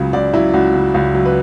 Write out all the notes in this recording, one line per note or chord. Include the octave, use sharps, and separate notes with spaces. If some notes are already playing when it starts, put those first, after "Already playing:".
Already playing: C#2 C#3 F#3
C#2 D5
F#3 E4
C#2 F#4
C#3
C#2
F#3
B4